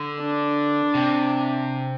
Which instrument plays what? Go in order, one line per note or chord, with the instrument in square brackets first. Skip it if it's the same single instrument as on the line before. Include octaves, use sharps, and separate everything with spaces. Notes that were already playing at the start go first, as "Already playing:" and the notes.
Already playing: [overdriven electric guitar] D3
[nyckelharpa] D4
[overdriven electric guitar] C3